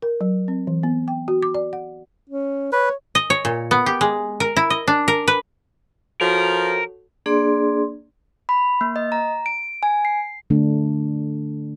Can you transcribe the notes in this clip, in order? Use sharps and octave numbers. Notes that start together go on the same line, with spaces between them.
A#4
F#3
C4
E3
B3
G5
F#4
D6
D5
F#5
C#4
B4 C#5
D#5
C#5
A#2
B3
G4
G#3
A#4
E4
D#5
D4
A#4
B4
F3 F#4 A4 A#4 C#5
A#3 D4 G#4 D5 C6
B5
A#3
D#5
A#5
D7
G#5
C7
D3 A3 D4